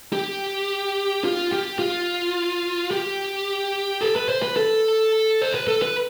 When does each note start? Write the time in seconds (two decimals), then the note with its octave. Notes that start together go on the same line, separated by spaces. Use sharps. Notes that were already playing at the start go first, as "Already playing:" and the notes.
0.13 G4
1.24 F4
1.52 G4
1.79 F4
2.91 G4
4.01 A4
4.16 B4
4.29 C5
4.42 B4
4.57 A4
5.42 C5
5.55 B4
5.68 A4
5.82 B4